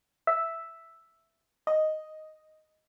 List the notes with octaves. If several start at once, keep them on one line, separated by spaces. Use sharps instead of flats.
E5
D#5